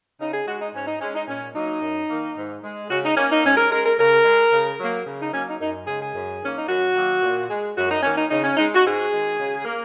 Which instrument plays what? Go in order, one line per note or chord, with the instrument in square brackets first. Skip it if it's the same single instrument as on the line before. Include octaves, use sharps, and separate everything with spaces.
[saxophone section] C#3 D#4
G#4
G#3 F#4
D#4
G#2 C#4
D#4
G#3 C#4
D#4
A#2 C#4
F#3 A#3 D#4
F#2
D#3 A#3
G#2
G#3
C#3 F#4
D#4
A#3 C#4
D#4
G#2 C#4
A#4
G#3 A#4
A#4
C#3 A#4
G#3
C#3
F#3 A#3
C#3
D#4
F#3 A#3 C#4
D#4
F#2 D#4
C#3 G#3 G#4
G#4
F#2
D#3 A#3 C#4
D#4
F#2 F#4
D#3 F#3 A#3
A#2
G#3
F#2 F#4
D#4
D#3 A#3 C#4
D#4
C#3 D#4
C#4
G#3 D#4
F#4
G#2 G#4
D#3 G#3
C#3
A#3